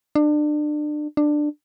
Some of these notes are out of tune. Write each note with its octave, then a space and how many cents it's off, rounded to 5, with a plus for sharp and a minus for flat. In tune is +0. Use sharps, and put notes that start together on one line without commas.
D4 +30
D4 +15